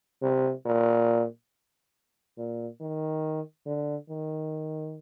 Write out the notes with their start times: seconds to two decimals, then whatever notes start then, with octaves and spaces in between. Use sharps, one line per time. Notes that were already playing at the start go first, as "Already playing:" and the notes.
0.22 C3
0.65 A#2
2.37 A#2
2.80 D#3
3.66 D3
4.09 D#3